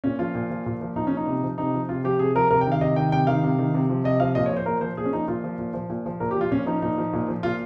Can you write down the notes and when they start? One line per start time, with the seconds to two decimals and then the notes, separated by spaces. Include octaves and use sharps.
0.04 A#2 C#4
0.19 F3 F4
0.35 A#2
0.50 F3
0.66 A#2
0.81 F3
0.96 A#2 D#4
1.07 C#4
1.11 F3
1.17 D#4
1.27 C3
1.43 F3
1.58 C3 D#4
1.74 F3
1.89 C3 F4
2.04 F3 G4
2.19 C3 G#4
2.36 F3 A#4
2.50 C3 A#4
2.61 G5
2.66 D#3
2.72 F5
2.81 C3 D#5
2.96 D#3 G5
3.12 C3 G5
3.27 D#3 F5
3.43 C3
3.58 D#3
3.74 C3
3.90 F3
4.04 C3 D#5
4.20 F3 F5
4.35 A#2 D#5
4.46 C#5
4.51 F3
4.57 C5
4.66 A#2 A#4
4.81 F3 C5
4.97 A#2 G#4
5.05 C#4
5.13 F3 D#4
5.28 A#2 F4
5.44 F3
5.59 A#2
5.74 F3
5.90 A#2
6.06 F3
6.20 A#2 A#4
6.31 G4
6.36 F3 F4
6.51 A#2 C#4
6.66 F3 D#4
6.82 A#2 D#4
6.98 F3
7.13 A#2
7.28 F3
7.43 A#2 F4